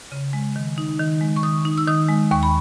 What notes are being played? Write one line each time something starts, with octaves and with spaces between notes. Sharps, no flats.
C#3
G#3
D#3
D#4
D#3
G#3
C#6
D#3 D#6
D#4
E6
D#3 D#6
G#3
D#2 C#6
B5